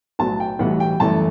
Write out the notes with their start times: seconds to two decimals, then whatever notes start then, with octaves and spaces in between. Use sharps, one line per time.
0.19 B1 A2 F#3 B3 A5
0.40 G5
0.59 B1 A2 E3 G3 B3 F#5
0.80 G5
1.00 G1 F#2 E3 A3 A5